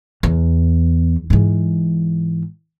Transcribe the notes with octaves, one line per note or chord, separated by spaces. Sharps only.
E2
G#2 E3